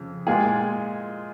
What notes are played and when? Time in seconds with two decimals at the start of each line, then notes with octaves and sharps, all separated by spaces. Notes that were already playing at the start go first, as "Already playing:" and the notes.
Already playing: F2 C#3
0.27 A#2 G#3 F4 G#4